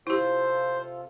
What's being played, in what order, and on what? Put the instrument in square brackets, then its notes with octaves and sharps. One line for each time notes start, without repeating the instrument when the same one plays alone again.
[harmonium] C3 F4 A4 [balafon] E4 G4 [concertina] C5